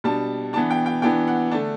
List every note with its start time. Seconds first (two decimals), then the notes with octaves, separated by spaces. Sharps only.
0.04 B2 G3 D4 A5
0.53 E3 B3 D4 A5
0.70 G5
0.86 G5
1.02 E3 B3 D4 G5
1.28 F#5
1.51 D3 A3 D4 A5